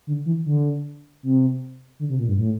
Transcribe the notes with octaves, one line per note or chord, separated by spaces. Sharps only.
D3
E3
D3
C3
D3
C3
A#2
G2
A2